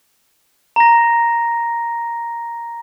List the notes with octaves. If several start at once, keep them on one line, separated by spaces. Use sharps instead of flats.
A#5 A#6